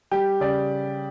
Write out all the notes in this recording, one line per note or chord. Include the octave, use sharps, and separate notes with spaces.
G3 G4
C#3 D5